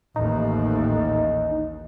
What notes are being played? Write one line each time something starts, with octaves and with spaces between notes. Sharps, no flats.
A1 D#2 D#4